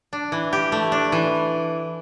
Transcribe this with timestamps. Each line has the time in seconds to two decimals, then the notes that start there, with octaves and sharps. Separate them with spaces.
0.13 D4
0.32 E3
0.53 G4
0.72 A3
0.92 D4
1.12 E3